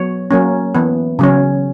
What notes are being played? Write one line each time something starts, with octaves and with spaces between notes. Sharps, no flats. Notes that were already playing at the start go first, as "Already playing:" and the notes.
Already playing: F#3 B3 C#5
F#3 A#3 C#4
E3 B3
C#3 F#3 C#4